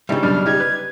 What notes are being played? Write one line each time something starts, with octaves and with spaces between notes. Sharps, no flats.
G2 C#3 G3 D#4 E4
F#2 B2 D4 F6
D#4 G4 G#6
B4